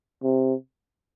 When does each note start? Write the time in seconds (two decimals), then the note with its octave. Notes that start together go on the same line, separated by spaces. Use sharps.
0.23 C3